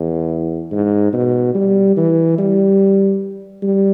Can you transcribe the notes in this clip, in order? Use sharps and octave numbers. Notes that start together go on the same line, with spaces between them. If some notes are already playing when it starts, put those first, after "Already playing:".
Already playing: E2
G#2
B2
G3
E3
G3
G3